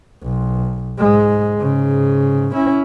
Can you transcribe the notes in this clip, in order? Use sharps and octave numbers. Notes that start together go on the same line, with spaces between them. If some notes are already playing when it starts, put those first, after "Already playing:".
B1
G#2 G#3
G#2 C#3
C#4 E4